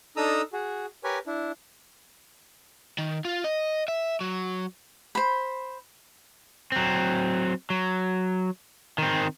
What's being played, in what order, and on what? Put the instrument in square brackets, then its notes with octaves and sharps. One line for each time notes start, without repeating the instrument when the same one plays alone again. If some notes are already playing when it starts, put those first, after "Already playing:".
[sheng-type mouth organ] D4 D#4 A4 A#5 D#6 E6
F#4 G#4
G4 A#4 B4 C#5 G#5
D4 E4
[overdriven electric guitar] D#3
F4
D#5
E5
F#3
[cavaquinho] C5 B5
[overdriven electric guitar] F#3 C4
F#3
D#3 C4